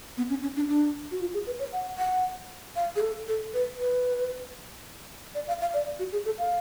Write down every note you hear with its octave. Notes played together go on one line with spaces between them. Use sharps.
B3
C#4
C#4
D4
D4
F#4
F4
G#4
B4
C#5
F#5
F#5
F5
G#4
A4
A4
B4
B4
D5
F5
F5
D5
F#4
G#4
A4
F5